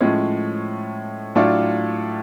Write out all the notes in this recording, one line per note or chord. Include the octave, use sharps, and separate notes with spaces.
A2 F3 G#3 C#4
A2 F#3 A3 D4 F4